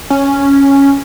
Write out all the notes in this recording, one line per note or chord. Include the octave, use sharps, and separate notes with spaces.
C#4